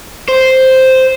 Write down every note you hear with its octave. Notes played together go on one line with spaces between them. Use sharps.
C5